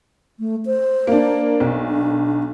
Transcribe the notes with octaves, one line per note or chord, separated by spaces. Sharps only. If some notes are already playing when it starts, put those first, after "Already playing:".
A3
C5
A#3 D4
B1
D4